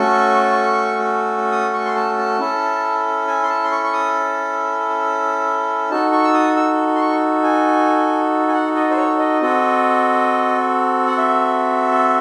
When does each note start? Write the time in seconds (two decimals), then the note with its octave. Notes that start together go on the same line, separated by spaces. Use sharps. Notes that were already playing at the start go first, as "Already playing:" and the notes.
Already playing: A3 C#4 F#4 A4 C#6
1.52 D#6
1.73 C#6
1.85 C6
1.96 A5
2.18 A5
2.40 C#4 E4 A4
3.27 G#5
3.43 C6
3.49 A5
3.64 C6
3.71 C#6
3.83 C#6
3.93 D#6
5.90 D#4 F#4 A4 A5
6.12 C#6
6.24 E6
6.34 D#6
6.56 E6
6.96 C6
7.00 C#6
7.43 G#5
8.48 G#5
8.53 F#5
8.76 D#5
8.90 C5
8.97 C#5
9.19 D#5
9.42 C4 F#4 A4
11.07 F#5
11.17 E5